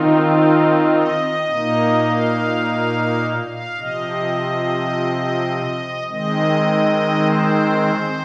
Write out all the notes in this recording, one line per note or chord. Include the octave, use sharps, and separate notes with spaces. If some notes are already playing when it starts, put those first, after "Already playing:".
Already playing: D#3 C4 D#4 F4
D#5
A#2 A#3 D#4
F5
F5
C3 F3 C4 D#5
D#3 G#3 C4 D#5
C5